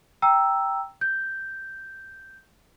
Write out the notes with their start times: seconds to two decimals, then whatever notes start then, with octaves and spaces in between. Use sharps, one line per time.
0.22 G5 A#5 E6
1.01 G6